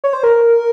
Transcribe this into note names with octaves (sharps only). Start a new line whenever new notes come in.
C#5
C5
A#4